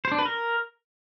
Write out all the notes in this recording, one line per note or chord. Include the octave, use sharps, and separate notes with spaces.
C5
D4
B4
A#4